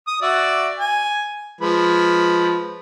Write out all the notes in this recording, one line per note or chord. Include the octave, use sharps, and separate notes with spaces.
D#6
F#4 D5 E5
G#5
F3 G#3 B4